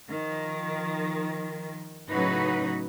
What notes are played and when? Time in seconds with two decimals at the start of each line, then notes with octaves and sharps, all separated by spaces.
0.10 D#3 F3
2.10 A2 C#3 F#3 D#4 F#4 B4